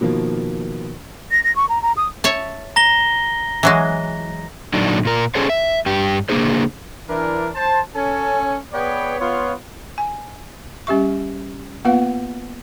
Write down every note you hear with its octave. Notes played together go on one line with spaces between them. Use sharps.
B2 D#3 F3 A#3
A#6
A#6
C#6
A#5
A#5
D#6
C#5 E5 A5
A#5 A#6 G7
E3 F#3 G#3
A#2 D3 F#3 D4 D#4
A#2 A#4
C#4 D4 G#4 A4 C5 C#5
E5
G2 G4
C#3 A#3 B3 D4 G#4 C5
E3 D4 A#4
C5 A5
C#4 A4 G#5
B3 G#4 B4 C#5 D5 G5
B3 F4 C#5
G#5
G3 C#4 G4 E5 C#6
A#3 B3 F4 B4 F5 F#5